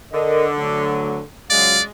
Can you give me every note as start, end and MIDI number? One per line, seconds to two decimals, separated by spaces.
0.13 1.22 50
0.13 0.46 70
0.13 0.46 75
0.57 1.18 38
0.57 1.18 54
1.50 1.78 37
1.50 1.78 54
1.50 1.88 56
1.50 1.82 74
1.50 1.78 77